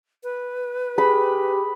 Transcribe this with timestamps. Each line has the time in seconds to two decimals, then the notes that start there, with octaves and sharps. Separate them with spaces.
0.24 B4
0.98 G4 G#4 B5